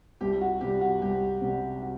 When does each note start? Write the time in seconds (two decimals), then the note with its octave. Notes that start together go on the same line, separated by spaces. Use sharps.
0.21 C2 G4
0.41 F#4
0.61 C3 G3 G4
0.81 F#4
1.01 C2 G4
1.41 C3 G3
1.82 F#4